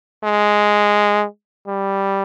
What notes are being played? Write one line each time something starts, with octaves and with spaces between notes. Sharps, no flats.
G#3
G3